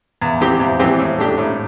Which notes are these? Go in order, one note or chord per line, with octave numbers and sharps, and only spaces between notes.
E2
E3 C4 G4
E2
E3 C4 G4
A2
A3 D4 G4
A2